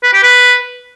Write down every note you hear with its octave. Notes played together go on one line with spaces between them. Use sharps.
B4
G4
B4